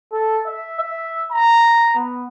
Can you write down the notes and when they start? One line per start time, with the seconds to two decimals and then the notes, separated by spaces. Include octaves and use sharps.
0.12 A4
0.46 E5
0.79 E5
1.32 A#5
1.95 B3